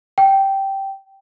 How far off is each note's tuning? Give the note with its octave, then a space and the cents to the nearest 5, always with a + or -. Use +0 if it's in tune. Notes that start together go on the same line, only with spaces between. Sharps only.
G5 -10